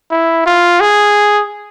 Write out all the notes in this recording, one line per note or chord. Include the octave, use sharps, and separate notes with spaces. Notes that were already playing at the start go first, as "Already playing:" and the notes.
E4
F4
G#4